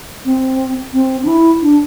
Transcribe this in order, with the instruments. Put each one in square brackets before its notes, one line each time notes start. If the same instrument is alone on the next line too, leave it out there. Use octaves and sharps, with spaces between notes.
[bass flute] C4
C4
D4
E4
D4